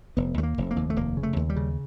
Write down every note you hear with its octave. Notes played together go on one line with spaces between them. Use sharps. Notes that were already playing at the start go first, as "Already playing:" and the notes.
F1 B3
D#2 A3
A#3
F1
A#3
D#2
A3
F1 A#3
C#3
A3
D#2
G3
C#3